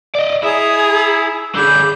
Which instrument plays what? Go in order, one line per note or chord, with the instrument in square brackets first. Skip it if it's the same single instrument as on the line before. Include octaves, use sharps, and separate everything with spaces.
[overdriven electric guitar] D5 D#5
[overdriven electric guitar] E4 [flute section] G#4 A#5 D#6
[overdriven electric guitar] D3 G#4 [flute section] B5 D6 G6